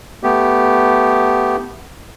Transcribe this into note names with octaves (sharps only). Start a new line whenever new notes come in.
A3 B3 G4